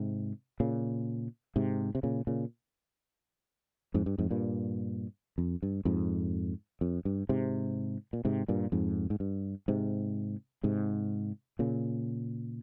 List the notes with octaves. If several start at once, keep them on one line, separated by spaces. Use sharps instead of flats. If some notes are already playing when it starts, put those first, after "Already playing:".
Already playing: G#2 C3
A#2 C#3
G#2 C3
C3
A#2 C#3
A#2 C#3
F2 G#2
G2
F2 G#2
G2 A#2
F2
G2
F2 G#2
F2
G2
G#2 C3
A#2
G#2 C3
G2 A#2
F2 G#2
G#2
G2
G#2 C3
G#2 C3
A#2 C#3